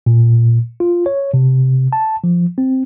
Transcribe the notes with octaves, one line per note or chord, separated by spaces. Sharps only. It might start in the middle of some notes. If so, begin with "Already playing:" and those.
A#2
F4
C#5
C3
A5
F3
C4